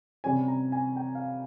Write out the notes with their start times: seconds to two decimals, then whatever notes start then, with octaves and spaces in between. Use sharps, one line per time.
0.24 C3 G3 C#4 G#5
0.48 A#5
0.72 G#5
0.96 G5
1.15 F5